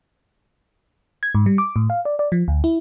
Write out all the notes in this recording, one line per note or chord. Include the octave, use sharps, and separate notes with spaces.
G#6
G#2
G3
D6
A2
F5
D5
D5
F3
D2
E4